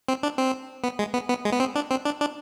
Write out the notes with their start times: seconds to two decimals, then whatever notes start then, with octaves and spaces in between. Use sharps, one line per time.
0.09 C4
0.23 D4
0.38 C4
0.84 B3
0.99 G#3
1.14 B3
1.29 B3
1.45 G#3
1.52 B3
1.60 C4
1.75 D4
1.91 C4
2.05 D4
2.20 D4